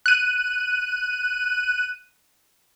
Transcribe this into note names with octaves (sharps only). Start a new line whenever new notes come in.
F#6 D#7